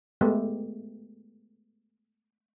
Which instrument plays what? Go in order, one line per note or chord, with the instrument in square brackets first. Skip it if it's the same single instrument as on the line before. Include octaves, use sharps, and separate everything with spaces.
[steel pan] G#3 A3 B3 G4